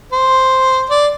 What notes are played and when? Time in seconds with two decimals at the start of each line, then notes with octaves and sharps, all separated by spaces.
0.12 C5
0.90 D5